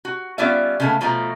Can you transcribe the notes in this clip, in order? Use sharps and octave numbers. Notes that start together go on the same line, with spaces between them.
F#4
G3 B3 C#4 F4 D5 E5
C#3 G#3 A3 B3 A5
B2 F3 A3 A#5